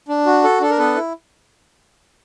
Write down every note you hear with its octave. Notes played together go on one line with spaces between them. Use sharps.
D4
F#4
A4
D4 A4
A#4
B3 A4 B4
E4